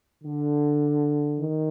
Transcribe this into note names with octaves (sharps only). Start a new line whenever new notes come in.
D3
D#3